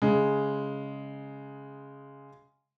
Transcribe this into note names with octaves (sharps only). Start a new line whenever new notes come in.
C#3 G#3